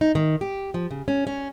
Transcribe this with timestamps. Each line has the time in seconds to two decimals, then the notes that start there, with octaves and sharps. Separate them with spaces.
0.01 D#4
0.15 D#3
0.41 G4
0.74 F3
0.91 C#3
1.08 C#4
1.27 C#4